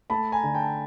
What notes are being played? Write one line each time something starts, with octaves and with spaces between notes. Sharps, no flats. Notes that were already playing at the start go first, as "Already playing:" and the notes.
A3 A5 B5
G#5 A#5
D3
G5 A5